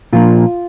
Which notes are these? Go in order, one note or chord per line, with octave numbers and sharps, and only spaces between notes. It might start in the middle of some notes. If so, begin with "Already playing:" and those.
A#2 F3 A#3 D4 F4